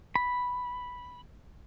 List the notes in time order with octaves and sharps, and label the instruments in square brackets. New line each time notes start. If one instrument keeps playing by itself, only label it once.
[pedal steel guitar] B5